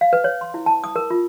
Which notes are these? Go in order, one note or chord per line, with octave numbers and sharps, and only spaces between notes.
F5
B4
C#5
C6
E4
A5
D#6
A#4
F4